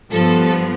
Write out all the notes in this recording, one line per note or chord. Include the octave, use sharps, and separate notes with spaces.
G2 F3 B3 A4